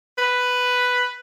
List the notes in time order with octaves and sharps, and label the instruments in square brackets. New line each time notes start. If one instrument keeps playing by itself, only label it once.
[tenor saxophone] B4